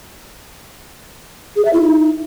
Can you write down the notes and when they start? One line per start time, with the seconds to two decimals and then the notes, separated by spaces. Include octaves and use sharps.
1.56 G#4
1.64 E5
1.73 E4
1.81 D#4